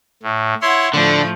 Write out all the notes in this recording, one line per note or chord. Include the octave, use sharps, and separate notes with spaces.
A2
E4 C#5 F#5 C6
A2 D3 F3 A3 D5